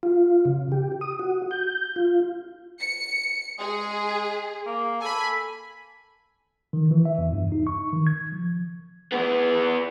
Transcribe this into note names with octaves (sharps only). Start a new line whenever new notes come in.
F4
C#3
G4
D#6
F#4
G6
F4
C#7
G#3 G#4
A#3
A4 G#5 B5
D#3
E3
E5
E2
G2
D#4
C#6
D#3
G#6
F3
E2 B3